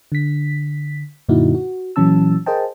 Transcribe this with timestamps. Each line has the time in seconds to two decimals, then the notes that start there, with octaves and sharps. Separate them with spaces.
0.12 D3 B6
1.29 F#2 A#2 D3 D#4 E4 F#4
1.55 F#4
1.96 A#2 E3 F#3 C#4 A5 E6
2.46 G#4 A#4 C5 D#5 G5 A5